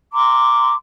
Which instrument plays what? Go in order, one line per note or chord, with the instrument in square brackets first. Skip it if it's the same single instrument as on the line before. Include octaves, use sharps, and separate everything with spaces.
[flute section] A#5 C6 D6